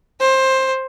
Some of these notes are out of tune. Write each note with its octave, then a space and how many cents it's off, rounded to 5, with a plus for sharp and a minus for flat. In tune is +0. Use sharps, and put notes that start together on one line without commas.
C5 +15